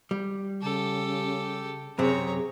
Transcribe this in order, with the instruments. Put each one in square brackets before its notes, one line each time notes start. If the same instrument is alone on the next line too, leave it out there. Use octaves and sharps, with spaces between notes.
[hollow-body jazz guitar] G3
[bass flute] C#3 [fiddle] G4 A4
[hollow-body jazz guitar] F#2 C3 C4 [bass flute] G#4 [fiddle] C#5 A#5